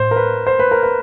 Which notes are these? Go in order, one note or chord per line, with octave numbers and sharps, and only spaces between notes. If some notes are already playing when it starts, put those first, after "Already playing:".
Already playing: A2 C5
A#4
B4
C5
B4
A#4
B4